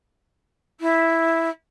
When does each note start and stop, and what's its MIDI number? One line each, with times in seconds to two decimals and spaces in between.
0.80 1.49 64